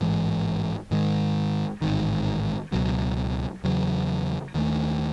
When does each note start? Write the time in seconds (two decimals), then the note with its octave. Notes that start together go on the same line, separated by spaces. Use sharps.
0.01 A1 G#2 E3 G#3
0.91 G#2 D#3 G#3
1.82 A1 G#2 D#3
2.72 C#2 B2 F#3
3.64 E2 C#3 F#3
4.54 D#2 D#3 A3